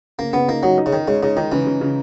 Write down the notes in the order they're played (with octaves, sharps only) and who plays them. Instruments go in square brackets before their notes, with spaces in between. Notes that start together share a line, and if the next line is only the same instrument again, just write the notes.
[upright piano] C#3 [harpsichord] A#3
[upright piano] C#3 [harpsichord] B3
[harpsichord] A#3 [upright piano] D#4
[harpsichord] F#3 [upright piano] D#4
[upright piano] D#4
[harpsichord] C#3
[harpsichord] D#3 [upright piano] D#4
[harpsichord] C#3 [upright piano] G#3
[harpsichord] C#3 [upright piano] D#4
[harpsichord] D#3 [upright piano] D#4
[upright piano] C#3 [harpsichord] E3
[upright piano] C#3
C#3